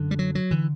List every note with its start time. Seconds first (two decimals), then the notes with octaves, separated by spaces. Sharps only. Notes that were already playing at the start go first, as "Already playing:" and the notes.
Already playing: F#2 D3
0.11 G3
0.19 F#3
0.35 F#3
0.51 D3 E3